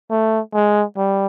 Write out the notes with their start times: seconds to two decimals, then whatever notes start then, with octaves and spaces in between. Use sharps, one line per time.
0.10 A3
0.54 G#3
0.97 G3